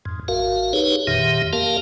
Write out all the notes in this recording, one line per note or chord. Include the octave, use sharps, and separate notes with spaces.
F2 G#2
A1 F#4 A#4 F5
D#4 G4 G#4 B4 C#5
F#1 F2 A#2 D#3 G4 E5
F2 A#3 G4 A#4 F5 A5